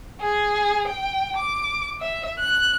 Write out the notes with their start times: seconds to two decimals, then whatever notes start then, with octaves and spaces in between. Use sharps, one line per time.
0.21 G#4
0.88 G5
1.36 D6
2.01 E5
2.39 F#6